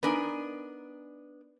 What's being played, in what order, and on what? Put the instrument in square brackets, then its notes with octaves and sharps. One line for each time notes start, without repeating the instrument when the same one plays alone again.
[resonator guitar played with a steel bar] B3 D4 G#5 [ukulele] D#4 A#4 B4